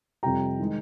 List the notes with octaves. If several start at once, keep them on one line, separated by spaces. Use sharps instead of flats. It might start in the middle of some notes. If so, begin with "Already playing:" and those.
F2 C3 G3 G5 A#5
D#3 G#3 D#4